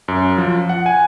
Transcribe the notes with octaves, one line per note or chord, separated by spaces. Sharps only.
F#2
F3
F#5
G#5